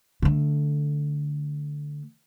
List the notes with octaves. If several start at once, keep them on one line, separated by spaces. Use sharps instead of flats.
D3 A3